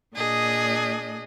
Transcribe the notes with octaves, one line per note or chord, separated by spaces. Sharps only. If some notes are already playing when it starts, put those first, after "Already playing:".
A#2 D4 G#4 D#5